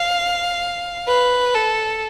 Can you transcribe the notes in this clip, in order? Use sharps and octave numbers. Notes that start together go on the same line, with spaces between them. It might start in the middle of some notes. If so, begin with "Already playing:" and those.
Already playing: F5
B4
A4